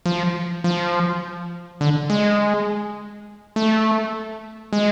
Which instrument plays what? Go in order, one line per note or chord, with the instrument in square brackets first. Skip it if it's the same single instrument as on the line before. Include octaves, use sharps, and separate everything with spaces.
[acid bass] F3
F3
D3
G#3
A3
G#3